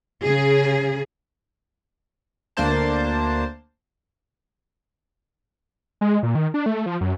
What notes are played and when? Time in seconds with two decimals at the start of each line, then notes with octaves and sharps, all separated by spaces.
0.23 C#3 G#4
2.57 D2 A#3 D4 C5 A5
6.01 G#3
6.23 A#2
6.35 D#3
6.54 D4
6.66 A3
6.86 F3
7.01 F#2